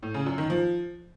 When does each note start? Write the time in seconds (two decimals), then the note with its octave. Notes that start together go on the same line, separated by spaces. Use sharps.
0.03 A2
0.14 C#3
0.26 F#2
0.38 D#3
0.50 F3